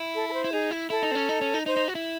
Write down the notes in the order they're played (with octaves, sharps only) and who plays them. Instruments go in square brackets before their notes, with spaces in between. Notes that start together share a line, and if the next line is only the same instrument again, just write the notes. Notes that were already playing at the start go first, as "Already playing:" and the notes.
Already playing: [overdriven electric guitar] E4
[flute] A4
A4
C5
[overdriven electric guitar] E4
[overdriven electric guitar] D#4 [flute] G#4
[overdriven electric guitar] E4
[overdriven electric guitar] E4 [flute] A4
[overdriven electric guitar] D#4
C4
C#4
D#4
C#4
D#4
[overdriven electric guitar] D#4 [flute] C5
[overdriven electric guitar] D#4
F#4
E4